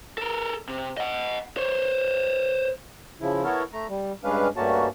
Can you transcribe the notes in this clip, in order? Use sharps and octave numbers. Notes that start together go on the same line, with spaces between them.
A4 A#4
C3
D#5 F#5
C5 C#5
C#3 F3 E4
B3 E4 A4 A#4 C#5
A3 A#5
G3
G2 G#3 C#4 D4 B4 F5
G2 A3 A#3 C#4 F#4 A5